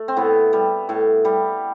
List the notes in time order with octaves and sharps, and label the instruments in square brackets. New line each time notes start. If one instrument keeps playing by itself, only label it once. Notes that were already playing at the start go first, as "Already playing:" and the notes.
Already playing: [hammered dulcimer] A3
C4
A2 B3
G3
A2
G3